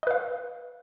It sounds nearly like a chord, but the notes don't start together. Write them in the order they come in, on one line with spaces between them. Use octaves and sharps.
D#5 B4 F5